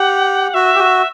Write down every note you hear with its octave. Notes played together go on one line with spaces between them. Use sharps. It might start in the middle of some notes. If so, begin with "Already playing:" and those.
Already playing: G4 F#5
F#4 E5
G4
F#4